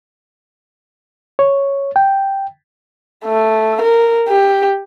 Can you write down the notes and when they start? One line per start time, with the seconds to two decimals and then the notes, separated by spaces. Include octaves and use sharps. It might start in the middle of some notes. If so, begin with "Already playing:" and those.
1.39 C#5
1.96 G5
3.25 A3
3.82 A#4
4.29 G4